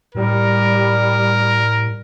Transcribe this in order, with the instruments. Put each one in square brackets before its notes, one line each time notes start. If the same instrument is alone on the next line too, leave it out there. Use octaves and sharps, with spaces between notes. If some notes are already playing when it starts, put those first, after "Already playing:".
[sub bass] A2 [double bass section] G3 [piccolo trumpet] A#4